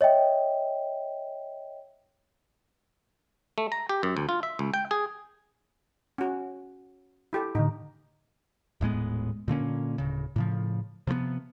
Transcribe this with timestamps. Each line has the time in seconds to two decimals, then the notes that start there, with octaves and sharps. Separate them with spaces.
0.01 C#5 D#5 E5 G5
3.58 A3
3.72 A#5
3.89 G4
4.03 F#2
4.17 D2
4.29 F4
4.43 E5
4.59 C#2
4.74 G5
4.91 G#4
6.18 C#4 F#4
7.33 E4 G4 A4
7.55 A2 D3 D#4
8.81 D#1 A2 G#3 B3
9.48 A#2 D3 A#3 C#4
9.98 D1 C#3
10.36 A2 C#3 F3
11.07 C3 F3 G3 B3